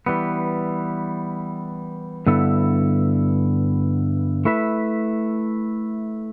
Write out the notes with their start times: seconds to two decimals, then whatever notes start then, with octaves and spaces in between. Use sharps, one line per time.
0.06 E3 G3 B3
2.27 G2 D3 B3 E4 A4
4.45 A3 E4 B4 E5